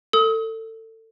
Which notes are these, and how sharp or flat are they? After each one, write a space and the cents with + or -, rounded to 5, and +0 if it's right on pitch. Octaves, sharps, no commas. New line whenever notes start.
A4 +25 D#6 +35